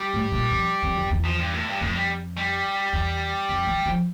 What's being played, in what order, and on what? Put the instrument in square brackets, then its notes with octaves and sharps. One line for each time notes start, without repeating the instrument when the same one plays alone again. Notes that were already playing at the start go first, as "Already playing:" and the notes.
Already playing: [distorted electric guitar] G3
[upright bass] A2
A#2
F2
F2
E2
E2
[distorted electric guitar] F3
G2
A2
G2
[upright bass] F2 [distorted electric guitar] A2
[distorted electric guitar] G3
G3
[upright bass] E2
F2
E3
F3